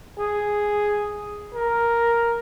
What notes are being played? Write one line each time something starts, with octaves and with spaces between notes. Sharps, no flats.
G#4
A#4